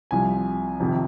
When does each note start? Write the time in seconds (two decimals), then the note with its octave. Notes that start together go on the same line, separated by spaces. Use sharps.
0.11 C2 C3 F3 G#5
0.80 F2 C3 D#3